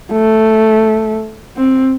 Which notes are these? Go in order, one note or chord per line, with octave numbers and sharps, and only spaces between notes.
A3
C4